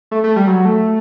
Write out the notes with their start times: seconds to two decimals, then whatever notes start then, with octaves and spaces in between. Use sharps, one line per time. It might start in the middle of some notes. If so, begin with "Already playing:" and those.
0.11 A3
0.24 A3
0.36 G3
0.47 F#3
0.65 A3